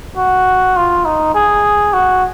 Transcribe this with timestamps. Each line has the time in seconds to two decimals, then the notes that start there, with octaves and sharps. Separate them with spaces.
0.17 F#4
0.77 F4
1.05 D#4
1.35 G#4
1.93 F#4